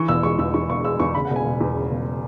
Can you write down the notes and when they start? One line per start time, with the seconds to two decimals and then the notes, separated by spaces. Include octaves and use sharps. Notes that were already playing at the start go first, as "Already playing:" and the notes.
Already playing: E3 C#6
0.08 E1 E6
0.23 G#3 C#6
0.39 E2 E6
0.54 E3 C#6
0.69 E1 C#6
0.85 G#3 E6
1.00 E2 C#6
1.15 C#3 B5
1.25 F#5
1.30 E1
1.36 G#5
1.46 E1
1.61 E2
1.77 C#3
1.91 E1